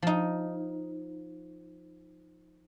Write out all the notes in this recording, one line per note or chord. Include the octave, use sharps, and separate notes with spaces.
F3 D#4